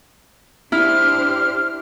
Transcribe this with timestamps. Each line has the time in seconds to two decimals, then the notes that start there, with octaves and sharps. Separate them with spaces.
0.72 D4 E4 G4 C5 F6